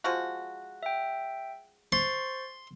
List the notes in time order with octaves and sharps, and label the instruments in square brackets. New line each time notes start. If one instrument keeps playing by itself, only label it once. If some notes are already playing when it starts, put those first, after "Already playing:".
[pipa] F3 G#3 F#4
[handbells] E5 G5
[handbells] C5 C#6 A6 [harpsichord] C6